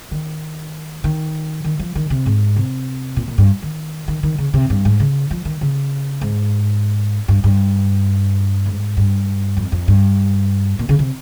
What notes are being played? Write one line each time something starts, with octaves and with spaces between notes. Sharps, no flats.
D#3
D#3
D#3
F3
D#3
C3
G#2
C3
A#2
A#2
G2
D#3
D#3
D#3
C#3
C3
G2
G#2
C#3
F3
D#3
C#3
G#2
G2
G2
G#2
G2
F2
F2
G2
A#2
C#3
C3